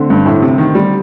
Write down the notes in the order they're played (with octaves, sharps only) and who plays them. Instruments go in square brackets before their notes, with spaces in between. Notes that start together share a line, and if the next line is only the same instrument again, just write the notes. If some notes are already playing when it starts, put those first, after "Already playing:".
Already playing: [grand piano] D3 A3 C4
[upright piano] G2
A2
C3
D#3
G3